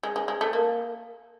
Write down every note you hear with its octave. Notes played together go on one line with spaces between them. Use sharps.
G#3
G#3
G#3
A3
A#3